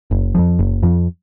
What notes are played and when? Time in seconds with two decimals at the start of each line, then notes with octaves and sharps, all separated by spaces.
0.11 F#1
0.35 F2 F3
0.59 F#1
0.83 F2 F3